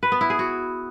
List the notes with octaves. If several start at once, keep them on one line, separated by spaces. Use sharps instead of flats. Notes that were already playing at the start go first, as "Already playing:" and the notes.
B4
B3
E4
G#4
F#4